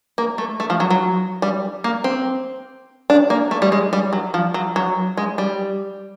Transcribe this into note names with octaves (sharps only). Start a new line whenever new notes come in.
A#3
A3
A3
F3
F#3
F#3
G3
A#3
C4
D4
A#3
A3
G3
G#3
G3
F#3
F3
F#3
F#3
G#3
G3